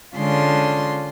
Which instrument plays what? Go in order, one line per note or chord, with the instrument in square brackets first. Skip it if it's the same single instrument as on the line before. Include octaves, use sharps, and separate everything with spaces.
[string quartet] D3 G#3 C#4 F4 C6